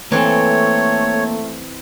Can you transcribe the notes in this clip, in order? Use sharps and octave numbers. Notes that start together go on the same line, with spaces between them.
E3 A3 A#3 C4 A4 C#5